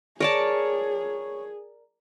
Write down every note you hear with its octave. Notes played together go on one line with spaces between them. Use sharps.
G#4 A#4 C#5 D5 A5